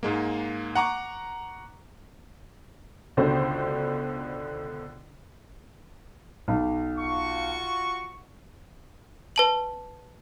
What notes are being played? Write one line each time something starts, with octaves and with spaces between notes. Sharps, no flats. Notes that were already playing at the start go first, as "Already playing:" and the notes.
G#2 G#3 A#3
F#5 A#5 C#6 D6
C#2 B2 D3 C5
B1
F4 F#4 C#6
B4 A5 F#7